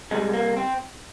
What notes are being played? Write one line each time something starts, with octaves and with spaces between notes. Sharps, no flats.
C3 G3 G#3
A#3
C4